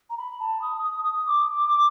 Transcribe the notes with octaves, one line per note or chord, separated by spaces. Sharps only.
A#5
B5
A5
D#6
D#6
D#6
D#6
D6